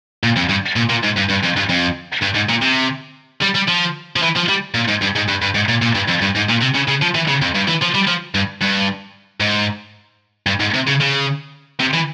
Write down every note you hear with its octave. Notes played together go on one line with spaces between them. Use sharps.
A#2
F2
G2
A#2
A#2
G#2
G2
G2
F2
G2
F2
G2
G#2
A#2
C3
G3
G3
F3
F3
E3
F3
G3
A#2
G#2
G2
G#2
G2
G2
G#2
A#2
A#2
G2
F2
G2
G#2
A#2
C3
C#3
C#3
F3
E3
C#3
F2
G2
E3
F3
G3
F3
G2
G2
G#2
G2
G#2
C3
C#3
C#3
C3
E3